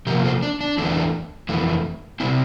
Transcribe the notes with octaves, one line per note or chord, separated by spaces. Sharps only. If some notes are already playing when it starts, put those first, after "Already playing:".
C3 F3 A#3 G4 A#4
A4 C5
D4
D4
E2 E3 A3 D4
F2 E3 A3
C3 G3 C4 E4